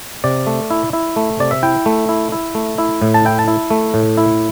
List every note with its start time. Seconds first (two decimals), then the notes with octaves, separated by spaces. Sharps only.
0.24 C3 D5
0.47 A3
0.70 E4
0.93 E4
1.16 A3
1.39 C3 D5
1.51 E5
1.63 E4 G5
1.86 A3
2.09 E4
2.32 E4
2.55 A3
2.78 E4
3.02 A2
3.14 A5
3.25 E4 G5
3.39 A5
3.48 E4
3.70 A3
3.94 A2
4.17 E4